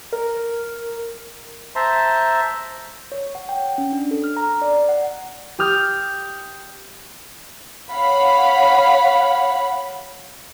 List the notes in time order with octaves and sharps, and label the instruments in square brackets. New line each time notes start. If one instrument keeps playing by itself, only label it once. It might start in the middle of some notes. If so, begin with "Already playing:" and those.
[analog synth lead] A#4
[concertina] C5 E5 A5 A#5 C6
[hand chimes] C#5
F#5
G5
C#4
D4
A4
F6
A#5
D5
F#5
[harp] G4 D#6 F6 G6
[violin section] C#5 F5 F#5 B5